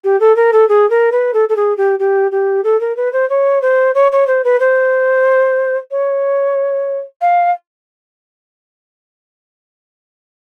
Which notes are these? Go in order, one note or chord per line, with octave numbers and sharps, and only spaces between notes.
G4
A4
A#4
A4
G#4
A#4
B4
A4
A4
G#4
G4
G4
G4
A4
A#4
B4
C5
C#5
C5
C#5
C#5
C5
B4
C5
C#5
F5